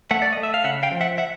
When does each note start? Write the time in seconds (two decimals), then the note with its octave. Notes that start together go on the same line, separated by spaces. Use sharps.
0.11 A3 E5 F#5
0.22 D5
0.32 D#5
0.37 A3
0.43 E5
0.54 F5
0.64 C#3 E5 F#5
0.83 F5 G5
0.92 F3
1.01 E5 F#5
1.18 E5 F#5